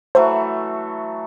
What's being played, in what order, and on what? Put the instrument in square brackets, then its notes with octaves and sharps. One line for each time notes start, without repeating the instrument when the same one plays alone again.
[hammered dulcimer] E3 F#3 A3 [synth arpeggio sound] C5